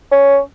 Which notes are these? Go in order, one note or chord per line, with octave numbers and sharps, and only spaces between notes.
C#4